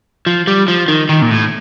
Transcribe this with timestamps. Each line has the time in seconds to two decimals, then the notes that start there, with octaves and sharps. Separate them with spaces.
0.27 F3
0.47 G3
0.68 F3
0.88 D#3
1.09 D#3
1.22 A#2
1.30 A2